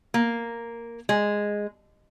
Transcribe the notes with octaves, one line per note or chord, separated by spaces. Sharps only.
A#3
G#3